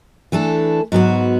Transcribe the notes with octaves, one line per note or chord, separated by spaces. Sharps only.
E3 A3 D4 A4
G#2 F#3 B3 F#4